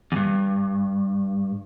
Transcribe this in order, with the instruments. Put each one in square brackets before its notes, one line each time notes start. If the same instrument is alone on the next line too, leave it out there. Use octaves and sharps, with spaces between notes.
[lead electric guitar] E2 G2